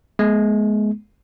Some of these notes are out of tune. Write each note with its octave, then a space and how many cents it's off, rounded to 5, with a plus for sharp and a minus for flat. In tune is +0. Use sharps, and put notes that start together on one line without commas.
G#3 +25 B3 -30